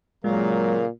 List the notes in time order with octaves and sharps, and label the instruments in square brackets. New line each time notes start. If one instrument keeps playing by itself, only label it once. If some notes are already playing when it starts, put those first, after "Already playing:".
[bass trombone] A#2 [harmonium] C#3 A#4 F5 [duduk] F#3 [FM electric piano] G#3